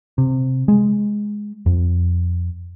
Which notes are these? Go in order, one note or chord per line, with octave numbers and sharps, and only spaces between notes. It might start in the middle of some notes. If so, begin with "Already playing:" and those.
C3
G#3
F2